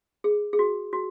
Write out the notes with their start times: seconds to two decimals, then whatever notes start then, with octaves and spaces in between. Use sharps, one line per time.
0.24 G#4
0.53 G#4
0.59 F#4
0.93 F#4